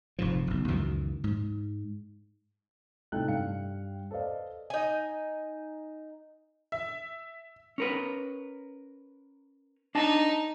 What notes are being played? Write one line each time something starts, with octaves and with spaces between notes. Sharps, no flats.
F1 G#2 F3
F#1 B1
C#2 F#2 D#3 E3
G#2
A2 C3 D#4 A4 G5 F#6
G2 F5 G5 C#7
A4 B4 C5 D5 D#5 F5
D#4 G#5
E5
C#4 A#4 B4
D4 D#4 D#5 A5